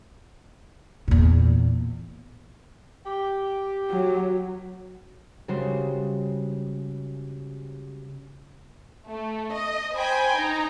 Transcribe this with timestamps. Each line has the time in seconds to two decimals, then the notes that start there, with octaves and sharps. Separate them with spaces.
1.08 E2 A#2
3.06 G4
3.90 F#3
5.48 C#3 G3 G#3 F#4 C5
9.08 A3
9.54 D#5
9.94 C5 G5 G#5 B5
10.35 D#4 A#5